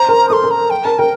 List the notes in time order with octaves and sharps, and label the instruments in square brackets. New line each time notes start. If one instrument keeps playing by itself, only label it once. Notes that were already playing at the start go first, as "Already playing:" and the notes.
Already playing: [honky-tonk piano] C5 [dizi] A#5
[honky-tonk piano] A#4
[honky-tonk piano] A4 [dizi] C6 D#6
[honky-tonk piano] A#4
[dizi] A#5
G5
[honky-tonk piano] A#4 [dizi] A5
[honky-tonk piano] A#4 [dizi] G5